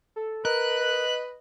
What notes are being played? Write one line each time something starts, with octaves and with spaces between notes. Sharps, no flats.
A4
A#4 B4 D#5 F#6